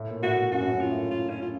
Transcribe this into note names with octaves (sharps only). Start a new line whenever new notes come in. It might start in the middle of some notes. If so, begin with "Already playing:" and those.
Already playing: A2
A#2
A2 F#4
A2
F#2 F#4
A2
F#2
F4
A2
F4
C#4
F4